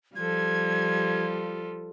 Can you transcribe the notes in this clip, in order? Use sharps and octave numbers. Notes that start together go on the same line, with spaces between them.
F3 G3 F4 A4 G#6